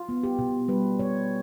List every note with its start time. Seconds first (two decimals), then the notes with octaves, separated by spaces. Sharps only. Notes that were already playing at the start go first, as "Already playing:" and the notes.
Already playing: F4
0.09 B3
0.23 G4
0.39 B2
0.68 G3 B4
0.99 B2 C#5